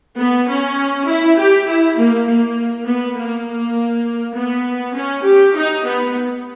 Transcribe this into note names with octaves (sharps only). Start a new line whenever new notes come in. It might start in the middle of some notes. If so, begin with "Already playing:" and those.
B3
C#4
E4
G4
E4
A#3
A#3
B3
A#3
B3
C#4
G4
D#4
B3